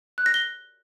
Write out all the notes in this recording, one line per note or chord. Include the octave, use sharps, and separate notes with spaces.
F#6
A#6
G7